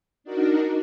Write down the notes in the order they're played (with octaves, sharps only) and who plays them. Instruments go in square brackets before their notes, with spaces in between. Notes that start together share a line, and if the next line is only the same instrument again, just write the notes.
[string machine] D4 D#4 F#4 A#4